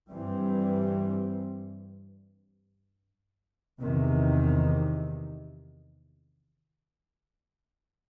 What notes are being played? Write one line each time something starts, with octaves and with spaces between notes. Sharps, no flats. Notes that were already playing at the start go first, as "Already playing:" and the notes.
G2 E3 G3 C4
E2 C3 D#3